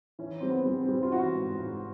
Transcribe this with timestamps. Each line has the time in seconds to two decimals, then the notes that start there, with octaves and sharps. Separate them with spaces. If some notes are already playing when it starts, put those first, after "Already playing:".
0.19 E3 C#4
0.40 G3 C4
0.49 B3
0.66 G3
0.81 C4
0.88 G3
1.03 F4
1.12 E3 F#4
1.35 G#2
1.58 G#2